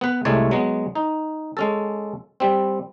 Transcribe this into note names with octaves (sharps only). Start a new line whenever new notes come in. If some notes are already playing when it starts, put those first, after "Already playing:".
B3 B4
C2 G#3 A3 E4 C#5 D5
F#3 G#3 B3
D#4
G#3 C#4 A4
G3 C4